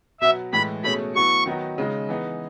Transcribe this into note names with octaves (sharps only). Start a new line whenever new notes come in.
B2 F#3 B3 E5
A2 E3 G#3 B5
B2 A3 C#4 G#4 B5
F#3 B3 E4 C#6
D#3 F#3 B3 D#4 F#4
C#3 G#3 D#4
E3 B3 D#4 G#4